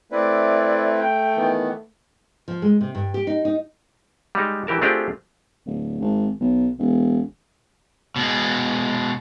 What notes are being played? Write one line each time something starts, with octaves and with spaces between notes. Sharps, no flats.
A3 C4 E4 B4 D5
G5
D#3 E3 B3
F3
G#3
C3
G2
G4
D#4
D#4
G3 G#3 D#4
E3 G4 A#4 A5
A3 C4 D4 F4 G4 G#4
D1
G#1
B1
E1
B2 G#3